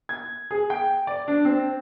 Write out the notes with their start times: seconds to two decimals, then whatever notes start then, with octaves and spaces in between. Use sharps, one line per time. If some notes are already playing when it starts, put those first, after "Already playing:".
0.09 G#6
0.51 G#4
0.70 G5
1.07 D5
1.28 D4
1.45 C4